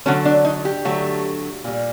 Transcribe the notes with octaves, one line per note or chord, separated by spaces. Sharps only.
D3 F#3 A3 C#4
D4
D#4
G4
D3 F#3 A3
A#2 G3